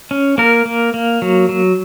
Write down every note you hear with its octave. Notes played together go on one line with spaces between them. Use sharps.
C#4
A#3 A#4
A#3
A#3
F#3
F#3